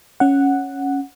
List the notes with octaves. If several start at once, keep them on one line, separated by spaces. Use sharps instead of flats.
C#4 F#5